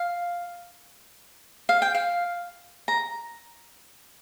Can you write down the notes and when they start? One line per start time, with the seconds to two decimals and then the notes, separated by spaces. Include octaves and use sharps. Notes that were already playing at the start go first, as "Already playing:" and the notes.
Already playing: F5
1.69 F5
1.82 G5
1.95 F5
2.88 A#5